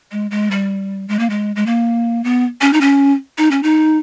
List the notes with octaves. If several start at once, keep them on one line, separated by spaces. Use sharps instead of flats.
G#3
G#3
G3
G#3
A#3
G#3
G#3
A#3
B3
C#4
D#4
C#4
D#4
C#4
D#4